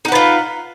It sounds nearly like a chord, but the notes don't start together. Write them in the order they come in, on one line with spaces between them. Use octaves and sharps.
D#4 F#5 B4 F4